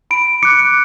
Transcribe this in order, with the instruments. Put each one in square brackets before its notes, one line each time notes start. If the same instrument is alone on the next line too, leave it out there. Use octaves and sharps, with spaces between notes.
[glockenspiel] B5 D7
D6 F#6 C#7